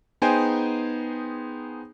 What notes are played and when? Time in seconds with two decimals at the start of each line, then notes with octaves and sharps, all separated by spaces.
0.22 B3 D#4 G#4 C5 G5 G#5